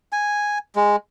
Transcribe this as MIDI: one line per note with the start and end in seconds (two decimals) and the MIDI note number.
0.12 0.58 80
0.76 0.96 56